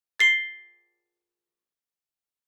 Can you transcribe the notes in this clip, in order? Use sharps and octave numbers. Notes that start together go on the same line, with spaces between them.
A6 C7 G7